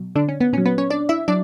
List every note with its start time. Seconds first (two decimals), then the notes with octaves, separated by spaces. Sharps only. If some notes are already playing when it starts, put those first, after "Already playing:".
Already playing: B2 F#3
0.15 D3 D4
0.28 C#4
0.41 B3
0.53 A#2 C#4
0.58 F#3
0.65 B3 B4
0.78 C#4 C#5
0.90 D4 D5
1.09 E4 E5
1.28 F#3 D4 D5